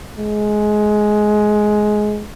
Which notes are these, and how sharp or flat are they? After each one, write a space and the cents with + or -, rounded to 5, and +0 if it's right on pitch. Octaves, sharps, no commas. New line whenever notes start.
G#3 +15